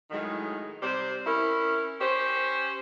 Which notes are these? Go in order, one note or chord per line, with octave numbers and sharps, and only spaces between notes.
A2 D#3 F#3 G#3
C3 G3 C5
C#4 E4 A#4
C#4 G4 C5